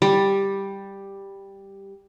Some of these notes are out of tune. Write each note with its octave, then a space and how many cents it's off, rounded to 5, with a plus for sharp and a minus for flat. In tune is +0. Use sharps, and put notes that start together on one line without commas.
G3 +5